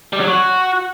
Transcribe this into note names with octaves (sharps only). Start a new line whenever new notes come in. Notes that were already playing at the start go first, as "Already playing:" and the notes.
G3
F#3
F#4